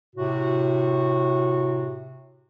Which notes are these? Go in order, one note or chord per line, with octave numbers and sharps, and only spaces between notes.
A2 C3 F#4